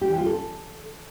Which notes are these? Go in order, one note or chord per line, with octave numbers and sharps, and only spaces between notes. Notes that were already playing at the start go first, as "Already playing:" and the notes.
G4
E3
F4
A4